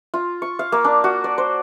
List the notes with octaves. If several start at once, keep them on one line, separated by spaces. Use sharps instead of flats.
F4
C#6
F5
A#3
D4
F#4
D5
C5